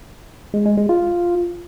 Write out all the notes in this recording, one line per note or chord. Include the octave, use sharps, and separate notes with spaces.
G#3
G#3
G#3
F4